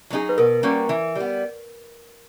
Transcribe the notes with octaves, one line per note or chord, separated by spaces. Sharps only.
F#3 B3 D#4 G#4
B4
B2 A#4
G3 A#3 C#4 F#4
E3
G3 B3